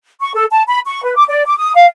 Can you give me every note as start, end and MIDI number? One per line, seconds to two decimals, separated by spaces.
0.20 0.31 85
0.34 0.45 69
0.51 0.63 81
0.67 0.79 83
0.86 1.03 85
1.04 1.16 71
1.16 1.24 86
1.29 1.43 74
1.45 1.57 86
1.57 1.72 87
1.75 1.86 77